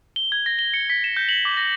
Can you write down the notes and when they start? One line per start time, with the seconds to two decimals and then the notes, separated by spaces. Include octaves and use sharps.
0.16 G7
0.32 G#6
0.46 A#6
0.59 G7
0.74 C#7
0.90 B6
1.04 E7
1.17 G6
1.29 F#7
1.45 D6
1.57 A#6